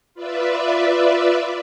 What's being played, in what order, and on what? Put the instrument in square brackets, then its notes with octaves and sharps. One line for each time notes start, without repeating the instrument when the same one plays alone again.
[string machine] F4 B4 D5 E5